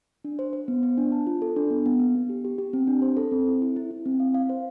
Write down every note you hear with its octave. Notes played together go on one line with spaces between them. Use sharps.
D4
C5
C5
B3
B3
D4
A5
F4
A4
D4
B3
B3
B3
B3
G4
G4
G4
C4
D4
C5
A4
C4
E4
E4
E4
E4
C4
F5
F5
C5